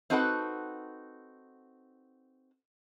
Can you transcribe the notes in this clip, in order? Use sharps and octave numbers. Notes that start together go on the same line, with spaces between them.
C4 D#4 F#4 A4 B4 F#5